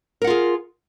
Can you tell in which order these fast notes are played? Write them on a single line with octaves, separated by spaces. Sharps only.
A#4 F#5 F4 G#4